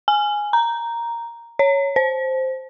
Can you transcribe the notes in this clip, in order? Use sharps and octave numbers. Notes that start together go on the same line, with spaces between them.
G#5
A#5
C#5
C5